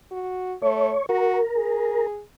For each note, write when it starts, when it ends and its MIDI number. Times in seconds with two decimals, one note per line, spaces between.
0.11 0.54 66
0.62 0.94 57
0.62 1.06 73
1.09 1.39 66
1.09 2.07 70
1.55 2.22 68